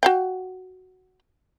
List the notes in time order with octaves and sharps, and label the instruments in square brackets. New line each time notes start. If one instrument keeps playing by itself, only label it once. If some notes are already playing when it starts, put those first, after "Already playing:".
[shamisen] F#4 F5 G5